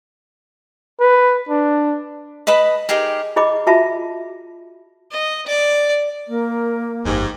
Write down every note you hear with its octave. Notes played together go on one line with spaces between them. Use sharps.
B4
D4
B4 D#5 A5 B5
D#4 G4 G#4 A#4
E4 G#4 D#5 B5 D6
F4 F#4 E5 A5 B5
D#5
D5
A#3 A#4
G1 F2 G#2 G4